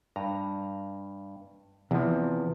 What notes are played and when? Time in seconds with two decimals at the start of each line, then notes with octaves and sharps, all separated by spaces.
0.16 G2 A#5
1.91 E2 C3 E3 F3